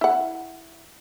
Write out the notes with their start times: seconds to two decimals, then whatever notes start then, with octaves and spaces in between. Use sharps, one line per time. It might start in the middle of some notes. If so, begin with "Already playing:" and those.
0.01 E4 F#5